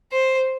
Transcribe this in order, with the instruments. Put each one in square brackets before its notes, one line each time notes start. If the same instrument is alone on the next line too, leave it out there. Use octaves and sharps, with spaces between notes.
[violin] C5